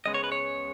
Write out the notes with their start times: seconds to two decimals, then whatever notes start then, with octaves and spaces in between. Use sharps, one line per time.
0.06 C#2 C#3 G#3 B3 D#5
0.14 C#5
0.24 B4
0.32 C#5